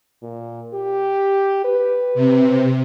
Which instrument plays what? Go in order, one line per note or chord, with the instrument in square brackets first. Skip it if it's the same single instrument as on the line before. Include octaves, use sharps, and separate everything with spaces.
[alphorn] A#2
G4
B4
[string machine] C3